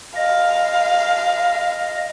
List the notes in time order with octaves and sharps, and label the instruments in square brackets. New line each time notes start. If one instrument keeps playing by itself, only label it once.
[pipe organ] D#5 [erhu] F5